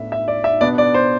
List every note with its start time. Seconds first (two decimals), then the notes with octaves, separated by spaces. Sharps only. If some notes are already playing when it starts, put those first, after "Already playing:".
Already playing: A2 B3 D4 E5
0.12 E5
0.28 D5
0.44 E5
0.61 B2 B3 D4 D5
0.78 D5
0.94 C5